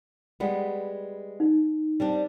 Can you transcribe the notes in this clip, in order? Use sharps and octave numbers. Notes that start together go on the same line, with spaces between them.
G3 G#3 B3
D#4
G3 C4 D4